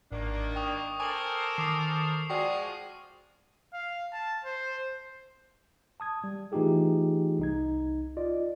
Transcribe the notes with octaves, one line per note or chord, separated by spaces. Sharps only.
G#1 G#2 D#3 A#3 D4
G5 C#6 D#6
A4 A#4 C5 G#5 D6 F#7
D#3 D6 D#6 C7
F3 G#3 F#4 G#4 D5 G5 C#6 C7
F5
A5
C5
A5 D#6 G#6
G3
E3 A3 D#4 F4 G4 G#4
C2 D#4 G#6
F4 D5 D#5